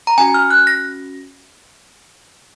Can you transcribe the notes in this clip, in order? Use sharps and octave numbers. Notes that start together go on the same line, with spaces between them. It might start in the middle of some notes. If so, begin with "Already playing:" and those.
A#5
C#4 F#4 G#5
F6
F#6
A#6